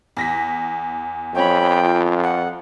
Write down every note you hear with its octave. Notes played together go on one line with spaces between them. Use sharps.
E2 A#6 B6
F2 C#5 G5 B5
F4
F#5